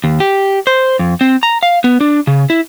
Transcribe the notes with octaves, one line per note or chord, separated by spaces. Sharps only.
D#2
G4
C5
F2
C4
A#5
F5
B3
D4
C#3
E4